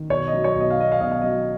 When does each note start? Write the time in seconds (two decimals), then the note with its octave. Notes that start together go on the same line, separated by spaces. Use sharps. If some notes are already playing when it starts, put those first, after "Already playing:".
Already playing: D#3
0.09 B1 C#5
0.28 D#5
0.33 F#3
0.44 C#5
0.56 B1 D#5
0.70 F5
0.79 B2 D#5
0.92 F5
1.01 B1 D#5
1.12 F5
1.22 F#3 D#5